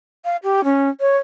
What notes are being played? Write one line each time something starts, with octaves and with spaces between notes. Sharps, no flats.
F5
G4
C#4
C#5